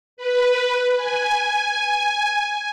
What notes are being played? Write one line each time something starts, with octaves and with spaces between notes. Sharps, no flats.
B4
G#5